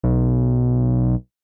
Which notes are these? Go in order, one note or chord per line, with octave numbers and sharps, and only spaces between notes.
B1